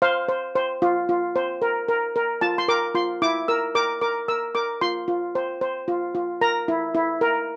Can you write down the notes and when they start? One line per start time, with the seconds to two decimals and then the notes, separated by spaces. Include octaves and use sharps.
0.02 C5 F5
0.29 C5
0.56 C5
0.82 F4
1.09 F4
1.36 C5
1.62 A#4
1.88 A#4
2.16 A#4
2.41 F4 A5
2.58 C6
2.68 A#4 D6
2.95 F4 C6
3.22 E4 D6
3.48 A#4 E6
3.75 A#4 D6
4.01 A#4 D6
4.28 A#4 E6
4.55 A#4 D6
4.81 F4 C6
5.08 F4
5.35 C5
5.61 C5
5.88 F4
6.15 F4
6.41 A#4 A#5
6.68 E4
6.95 E4
7.21 A#4